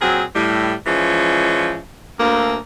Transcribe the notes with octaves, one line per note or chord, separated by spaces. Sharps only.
A#2 F#3 C4 G#4
A2 G3
E3 F3 G#3 C#4
D2 A#3